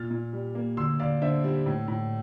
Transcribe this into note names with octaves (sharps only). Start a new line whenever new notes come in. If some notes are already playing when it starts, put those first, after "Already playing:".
Already playing: A#2 F6 A6
A#2
G3
A#3
D2 C6 E6
D2 D5 F5
D3 C5 E5
G3
A2
A2